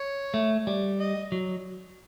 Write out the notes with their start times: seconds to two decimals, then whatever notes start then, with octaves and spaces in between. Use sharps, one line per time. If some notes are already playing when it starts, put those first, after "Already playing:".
Already playing: C#5
0.34 A3
0.67 G3
1.00 D#5
1.32 F#3